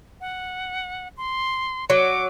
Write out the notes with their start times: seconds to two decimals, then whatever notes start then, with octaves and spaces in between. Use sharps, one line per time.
0.21 F#5
1.17 C6
1.90 F#3 D6